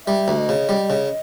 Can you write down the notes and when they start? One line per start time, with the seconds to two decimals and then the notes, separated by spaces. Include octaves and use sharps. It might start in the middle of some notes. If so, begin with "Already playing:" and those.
0.06 G3 E5
0.28 D2
0.38 D#5
0.49 C#3
0.69 G3
0.90 C#3